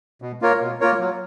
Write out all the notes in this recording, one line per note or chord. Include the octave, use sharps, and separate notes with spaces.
B2
A#3 F4 A#4 C#5
B2
A#3 F4 A#4 C#5
F#3